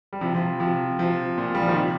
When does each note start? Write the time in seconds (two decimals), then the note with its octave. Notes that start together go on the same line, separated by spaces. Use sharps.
0.13 G3
0.21 C3 F3
0.34 C3 F3
0.60 C3 F3
0.99 C3 F3
1.38 A#2
1.55 G3
1.62 F3
1.69 D#3
1.75 C3